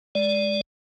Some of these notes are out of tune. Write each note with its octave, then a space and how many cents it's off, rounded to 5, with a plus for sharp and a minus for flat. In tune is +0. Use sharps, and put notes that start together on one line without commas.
G#3 +0 D5 -10